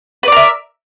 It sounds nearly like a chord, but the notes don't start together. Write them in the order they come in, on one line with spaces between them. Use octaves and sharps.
B4 D5 A#4 E5